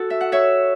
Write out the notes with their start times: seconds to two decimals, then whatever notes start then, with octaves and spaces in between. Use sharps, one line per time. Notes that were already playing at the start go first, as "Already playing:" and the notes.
Already playing: F#4 A4
0.10 E5
0.21 F#5
0.32 C#5 E5